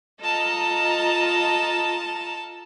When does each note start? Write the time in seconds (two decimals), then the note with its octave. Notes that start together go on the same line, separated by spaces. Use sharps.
0.21 F4 A4 D#5 A5 A#5